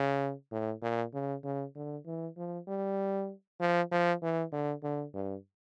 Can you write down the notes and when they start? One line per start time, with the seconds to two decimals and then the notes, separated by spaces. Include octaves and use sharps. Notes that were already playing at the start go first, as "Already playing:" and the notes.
Already playing: C#3
0.52 A2
0.82 A#2
1.14 C#3
1.44 C#3
1.75 D3
2.06 E3
2.37 F3
2.68 G3
3.60 F3
3.91 F3
4.22 E3
4.52 D3
4.83 D3
5.14 G2